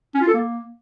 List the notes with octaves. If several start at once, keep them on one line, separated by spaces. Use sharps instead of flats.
C#4
F4
A4
A#3